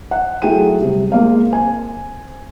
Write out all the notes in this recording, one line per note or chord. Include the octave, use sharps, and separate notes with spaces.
F#5
F#3 A3 E4 G#4 G5 D#7
C3 G3
G#3 A#3 F5
C4 G#5